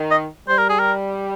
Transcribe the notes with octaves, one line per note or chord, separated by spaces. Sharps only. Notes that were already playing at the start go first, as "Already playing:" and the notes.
Already playing: D#3
D#5
G3 C5
A#4
G#4
A#4